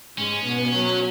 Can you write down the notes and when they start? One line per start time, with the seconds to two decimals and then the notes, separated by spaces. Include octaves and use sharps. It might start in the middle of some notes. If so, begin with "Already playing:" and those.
0.17 G#2 G#3 C#4
0.46 B2 B3
0.75 F#3